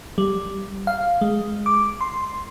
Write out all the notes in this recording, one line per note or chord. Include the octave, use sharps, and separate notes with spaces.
G3
F5
G#3
D6
C6